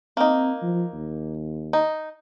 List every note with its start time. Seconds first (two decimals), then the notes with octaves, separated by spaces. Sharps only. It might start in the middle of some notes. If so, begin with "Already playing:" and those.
0.17 A#3 C4 D#4
0.62 F3
0.94 D#2
1.73 D#4